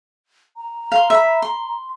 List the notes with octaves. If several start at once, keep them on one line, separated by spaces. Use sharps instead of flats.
A#5
F5 C6
E5 B5
C6